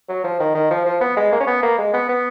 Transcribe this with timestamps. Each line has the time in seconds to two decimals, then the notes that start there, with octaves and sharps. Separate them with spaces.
0.09 F#3
0.24 F3
0.40 D#3
0.55 D#3
0.70 F3
0.86 F3
1.01 B3
1.17 G#3
1.32 A#3
1.40 C#4
1.47 B3
1.63 A#3
1.78 G#3
1.94 B3
2.09 B3